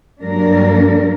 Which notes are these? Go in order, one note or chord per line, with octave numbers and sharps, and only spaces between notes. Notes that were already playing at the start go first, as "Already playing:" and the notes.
G2 F#3 A#3 D4 A#4